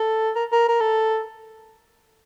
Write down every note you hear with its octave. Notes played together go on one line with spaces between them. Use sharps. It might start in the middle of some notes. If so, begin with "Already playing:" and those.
Already playing: A4
A#4
A#4
A#4
A4